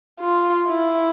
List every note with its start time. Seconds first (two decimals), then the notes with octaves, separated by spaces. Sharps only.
0.20 F4
0.68 E4